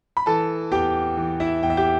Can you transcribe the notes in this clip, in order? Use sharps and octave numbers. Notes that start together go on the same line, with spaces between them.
B5
E3 A4 A5
E2 G4 G5
E3
E4 E5
E2 G5
E5
G4 G5